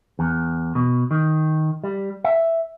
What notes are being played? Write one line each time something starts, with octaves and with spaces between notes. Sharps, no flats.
E2
B2
D#3
G3
E5